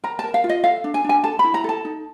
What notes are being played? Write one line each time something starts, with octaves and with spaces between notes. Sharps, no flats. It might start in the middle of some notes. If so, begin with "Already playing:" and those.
A#4 A#5
A5
A#4
F5
F4
D#5
A4 F5
D4
G#5
D4 G#5
A4 A5
B5
E4
A#5
A4 A5
D#4